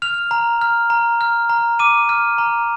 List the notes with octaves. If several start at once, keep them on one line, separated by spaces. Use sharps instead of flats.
F6 F7
A#5
F6
A#5
F6
A#5
D6 D#7
F6
A#5